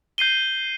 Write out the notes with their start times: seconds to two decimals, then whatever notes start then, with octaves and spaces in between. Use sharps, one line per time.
0.18 G6 C7 D#7 G7